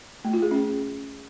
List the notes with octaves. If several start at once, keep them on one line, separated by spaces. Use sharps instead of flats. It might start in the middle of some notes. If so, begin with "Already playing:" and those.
A3
F4
G#4
C#4